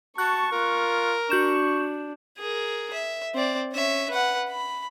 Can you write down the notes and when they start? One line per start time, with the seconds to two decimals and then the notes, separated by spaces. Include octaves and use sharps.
0.18 F#4 A5 C#6 F#6
0.52 F4 A#4
1.30 D4 F#4 C#6 G6 E7
2.38 G#4 A#4
2.93 E5
3.34 C4 D5
3.72 C#4 E5
4.10 B4 F#5
4.49 B5